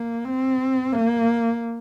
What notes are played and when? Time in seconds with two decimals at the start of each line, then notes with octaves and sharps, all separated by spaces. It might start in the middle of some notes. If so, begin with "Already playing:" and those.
Already playing: A#3
0.25 C4
0.92 A#3